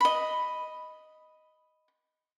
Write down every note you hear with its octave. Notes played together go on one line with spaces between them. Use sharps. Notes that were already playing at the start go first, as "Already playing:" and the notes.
D#5 B5